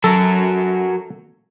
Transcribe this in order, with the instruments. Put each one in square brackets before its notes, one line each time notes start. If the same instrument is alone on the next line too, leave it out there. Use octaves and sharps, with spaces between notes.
[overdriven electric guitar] F#3 A#4 [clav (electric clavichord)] A4